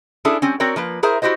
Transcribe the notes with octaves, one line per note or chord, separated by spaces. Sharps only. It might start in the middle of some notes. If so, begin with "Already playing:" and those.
C#4 D4 E4 G#4 A4
G3 C4 C#4
C4 F#4 A#4 C#5 D5
F3 A#3 B4
E4 G#4 A#4 C5 E5
E4 F#4 G4 C5 D#5